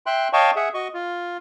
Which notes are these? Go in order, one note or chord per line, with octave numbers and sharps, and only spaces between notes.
E5 G5 C6 F#6
C#5 D#5 F5 G5 A5 C#6
G#4 E5 F#5
F#4 D#5 C#6
F4